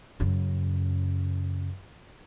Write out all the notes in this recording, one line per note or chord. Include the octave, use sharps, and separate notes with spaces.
F#2 C#3